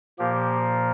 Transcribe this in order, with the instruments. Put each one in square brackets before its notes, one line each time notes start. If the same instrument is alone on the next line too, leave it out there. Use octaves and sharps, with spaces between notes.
[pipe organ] A#2 F3 A#3 G4